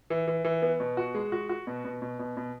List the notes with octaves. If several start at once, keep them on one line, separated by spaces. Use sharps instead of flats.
E3
E3
E3
B3
B2
F#4
G#3
F#4
F#4
B2
B2
B2
B2
B2